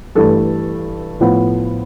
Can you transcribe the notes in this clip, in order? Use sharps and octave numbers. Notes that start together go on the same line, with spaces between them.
G2 E3 A3 A4
A2 F3 B3